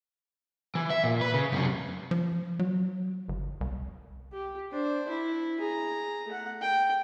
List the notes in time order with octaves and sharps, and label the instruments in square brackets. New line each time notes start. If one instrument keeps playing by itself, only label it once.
[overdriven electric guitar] E3
E5
A#2
B4
C#3
F#2 C3
[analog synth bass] F3
F#3
G1
C2
[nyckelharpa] G4
D4 C5
E4
G#4 A#5
A3 F#5
G5